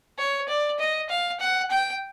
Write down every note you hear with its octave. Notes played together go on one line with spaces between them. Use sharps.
C#5
D5
D#5
F5
F#5
G5